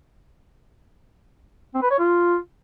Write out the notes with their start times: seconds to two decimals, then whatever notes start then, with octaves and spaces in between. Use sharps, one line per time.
1.75 C4
1.83 B4
1.91 C#5
1.99 F4